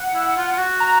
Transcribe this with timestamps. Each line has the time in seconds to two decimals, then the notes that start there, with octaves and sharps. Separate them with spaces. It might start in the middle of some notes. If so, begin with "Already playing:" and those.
Already playing: F#5
0.14 E4
0.37 F4
0.52 F4
0.58 F#4
0.80 A#5